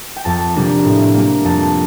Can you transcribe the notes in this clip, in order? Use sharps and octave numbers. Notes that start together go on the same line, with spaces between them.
G5
F2 A5
C3 G3 A#3 D4
A2
G3 A#3
F2 A5